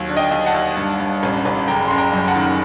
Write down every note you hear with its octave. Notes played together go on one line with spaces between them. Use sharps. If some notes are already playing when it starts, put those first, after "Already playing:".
Already playing: D#2 F#3
D3
D#5 G5
D#2
F#5 A5
D#2
G2
G2
A1
A1
F#1 G5 A#5
F#1 C6
G5 A#5
F#2
F#5 A5
D#3